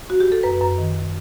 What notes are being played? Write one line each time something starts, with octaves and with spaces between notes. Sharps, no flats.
F#4
G4
A4
F#2 B4
F#2
D#3